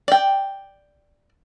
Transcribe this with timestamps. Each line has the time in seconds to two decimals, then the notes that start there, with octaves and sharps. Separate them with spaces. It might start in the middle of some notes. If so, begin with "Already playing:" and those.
0.08 D5 G5